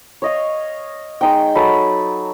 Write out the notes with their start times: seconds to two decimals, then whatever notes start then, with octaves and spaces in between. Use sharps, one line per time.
0.22 C#5 D#5 F5
1.21 G#3 D#4 G5
1.55 F#3 A4 B5